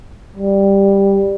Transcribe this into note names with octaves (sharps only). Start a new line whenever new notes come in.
G3